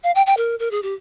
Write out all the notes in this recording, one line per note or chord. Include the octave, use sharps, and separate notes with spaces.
F5
G5
G5
A#4
A#4
G#4
G4